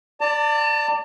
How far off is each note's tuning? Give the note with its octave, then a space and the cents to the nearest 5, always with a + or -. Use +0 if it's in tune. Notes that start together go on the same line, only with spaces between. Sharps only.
D5 +0 A5 +35